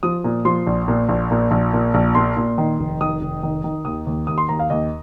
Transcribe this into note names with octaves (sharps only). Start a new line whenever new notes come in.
F3 D#6
A#2
F3 C6
A#1
A#2
A#1
A#2
A#1
A#2
A#1
A#2 C6
A#2
D#3
F1
D#3 D#6
F1
D#3
D#3
D#2 D#6
D#2
D#2 D#6
C6
D#2 A#5
F5
D#2 D#5